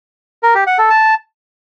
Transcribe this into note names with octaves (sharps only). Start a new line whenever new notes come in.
A#4
G4
F#5
A4
A5